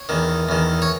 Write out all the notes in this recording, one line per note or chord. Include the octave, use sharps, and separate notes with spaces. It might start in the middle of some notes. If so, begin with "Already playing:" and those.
Already playing: C#5
E2 D#3
E2 D#3
C#5